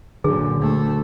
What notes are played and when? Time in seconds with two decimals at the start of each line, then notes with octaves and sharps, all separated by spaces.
0.24 F#2 A#2 D3 G#4
0.60 D2 A3